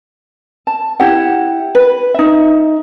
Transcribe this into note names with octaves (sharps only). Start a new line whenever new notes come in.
A5
E4 G4 F#5
B4
D#4 E5